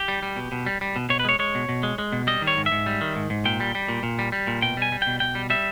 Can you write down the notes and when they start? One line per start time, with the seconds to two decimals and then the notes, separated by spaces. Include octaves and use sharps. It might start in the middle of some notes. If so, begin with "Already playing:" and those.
Already playing: G4
0.08 G3
0.23 G3
0.36 B2
0.52 B2
0.66 G3
0.81 G3
0.96 B2
1.10 B2 C#5
1.20 B4
1.25 G#3 C#5
1.39 G#3 C#5
1.55 B2
1.69 B2
1.83 G#3
1.98 G#3
2.13 B2
2.27 G3 D#5
2.42 D#3
2.47 C#5
2.57 G#2
2.66 E5
2.72 G#2
2.86 G3
3.01 D#3
3.16 G#2
3.30 G#2
3.45 A#2 G5
3.60 G3
3.75 G3
3.88 A#2
4.03 A#2
4.19 G3
4.32 G3
4.47 A#2
4.62 B2 G5
4.77 G3 G#5
4.92 G3
5.02 B2 G5
5.20 B2 G5
5.35 G3
5.50 G3 E5